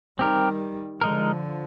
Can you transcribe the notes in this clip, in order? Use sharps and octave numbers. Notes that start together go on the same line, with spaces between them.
D#3 G3 C4 G4 A#4
D3 F3 G#3 D#4 A#4